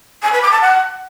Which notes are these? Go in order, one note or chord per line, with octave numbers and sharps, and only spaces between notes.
G#5
B4
D6
A5
F#5